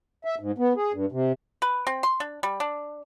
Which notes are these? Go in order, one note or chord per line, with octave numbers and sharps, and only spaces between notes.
E5
G#2
B3
G#4
G2
C3
B4
C4
C6
D4
G3
D4